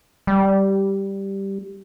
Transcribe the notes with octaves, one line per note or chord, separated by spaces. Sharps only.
G3